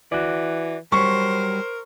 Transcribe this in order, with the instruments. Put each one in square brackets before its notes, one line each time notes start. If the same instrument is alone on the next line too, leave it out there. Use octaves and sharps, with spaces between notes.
[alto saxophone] E3 [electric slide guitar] F#4 D5
[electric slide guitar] F#3 G3 [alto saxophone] A#4 [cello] C5 [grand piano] C#6